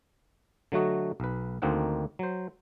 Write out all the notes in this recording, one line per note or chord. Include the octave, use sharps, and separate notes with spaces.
D3 F#3 A3 F#4 D#5
B1 B4
D2 D#3 A#3 C4 D#4 F#5
F#3 C5